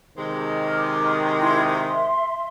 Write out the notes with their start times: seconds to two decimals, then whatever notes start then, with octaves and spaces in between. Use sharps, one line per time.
0.17 C3 D#3 G#3
0.63 D6 F6
1.40 E4 C6 G#6
1.69 E5 C6